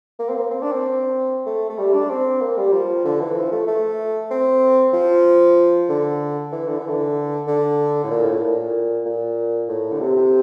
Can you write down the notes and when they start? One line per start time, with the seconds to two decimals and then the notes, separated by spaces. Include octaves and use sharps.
0.19 A#3
0.29 C4
0.35 A#3
0.51 C4
0.62 D4
0.72 C4
1.46 A3
1.70 A3
1.78 G3
1.93 D4
2.10 C4
2.41 A#3
2.57 G3
2.72 F3
3.05 D3
3.21 E3
3.36 F3
3.52 A3
3.67 A3
4.31 C4
4.93 F3
5.89 D3
6.52 E3
6.67 D3
6.79 E3
6.89 D3
7.47 D3
8.04 A2
8.11 A#2
8.25 A2
8.42 A#2
9.06 A#2
9.68 A2
9.92 D3
10.01 C3
10.16 C3